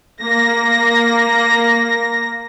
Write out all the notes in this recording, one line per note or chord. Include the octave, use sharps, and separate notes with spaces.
A#3 A#6